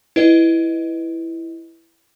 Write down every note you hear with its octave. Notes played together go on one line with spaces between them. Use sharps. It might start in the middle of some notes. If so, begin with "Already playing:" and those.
E4 B4 D#5